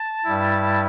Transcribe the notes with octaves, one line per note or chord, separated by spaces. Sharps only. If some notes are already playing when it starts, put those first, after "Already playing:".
Already playing: A5
G2 G3 E4